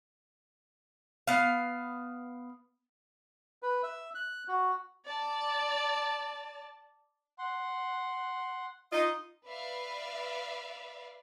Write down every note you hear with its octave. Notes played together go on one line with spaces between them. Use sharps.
B3 F5
B4
E5
F#6
F#4
D5 A5
F#5 C6
D#4 F4 D#5
B4 D5 E5 F5